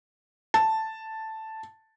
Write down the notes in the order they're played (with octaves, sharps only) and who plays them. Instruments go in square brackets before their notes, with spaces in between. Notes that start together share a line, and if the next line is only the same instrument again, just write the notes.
[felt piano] A5